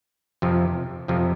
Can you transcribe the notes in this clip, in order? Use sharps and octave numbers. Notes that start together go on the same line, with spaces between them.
F2 C3 F3
F2 C3 F3